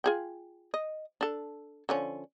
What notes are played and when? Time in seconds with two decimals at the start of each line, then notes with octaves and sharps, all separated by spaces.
0.04 F4 G#4 G5
0.74 D#5
1.21 D4 A4
1.89 D3 F3 C#4